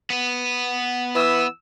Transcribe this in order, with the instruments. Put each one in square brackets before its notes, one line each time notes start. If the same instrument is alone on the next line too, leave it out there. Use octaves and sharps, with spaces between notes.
[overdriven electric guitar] B3 B4
[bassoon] E3 [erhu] E6